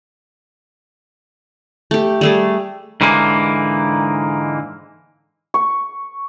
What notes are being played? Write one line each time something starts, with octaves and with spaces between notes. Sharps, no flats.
A3 G4
G3 A3 G#4
G#2 D3 E3 G#3 A#3
C#6